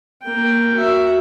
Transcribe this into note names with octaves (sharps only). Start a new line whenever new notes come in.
A#3 G5
F#4 E5